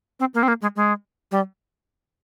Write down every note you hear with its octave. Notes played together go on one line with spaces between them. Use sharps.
C4
A#3
C4
A#3
G#3
G#3
G3